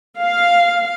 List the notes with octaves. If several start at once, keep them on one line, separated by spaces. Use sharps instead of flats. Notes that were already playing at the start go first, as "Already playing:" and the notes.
F5